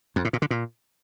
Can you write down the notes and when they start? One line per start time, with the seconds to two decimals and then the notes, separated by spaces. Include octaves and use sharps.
0.16 F2
0.25 A2
0.33 A#2
0.42 D3
0.51 A#2